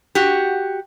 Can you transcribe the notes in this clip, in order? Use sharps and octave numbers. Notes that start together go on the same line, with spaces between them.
F#4 G4